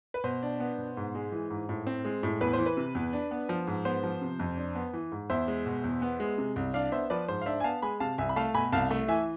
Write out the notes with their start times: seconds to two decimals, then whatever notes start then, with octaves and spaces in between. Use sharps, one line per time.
0.14 B4
0.24 B2 C5
0.43 D4
0.60 B3
0.78 B2
0.97 G#2
1.15 G#3
1.32 E3
1.50 G#2
1.69 A2
1.87 C4
2.05 G#3
2.23 A2
2.41 E2 B4
2.53 C5
2.59 E3
2.66 B4
2.77 C3
2.95 E2
3.13 D4
3.31 B3
3.49 F3
3.67 G#2
3.85 B3 C5
4.03 F3
4.22 C3
4.39 F2
4.57 D4
4.75 B3
4.94 E3
5.12 G#2
5.30 E2 C5 E5
5.48 G#3
5.66 B2
5.84 E2
6.02 B3
6.20 G#3
6.38 C3
6.56 C2
6.74 D4 D5 F5
6.92 B3 C5 E5
7.10 F3 B4 D5
7.28 G#2 C5
7.41 F5
7.46 D4 C5 E5
7.60 G#5
7.64 B3 F5 A5
7.82 G#3 G#5 B5
8.00 C3 F5 A5
8.18 C2 E5 G#5
8.29 B5
8.36 A3 F5 A5
8.54 B2 G#5 B5
8.72 C2 F5 A5
8.91 A3
9.08 E3 E5 G#5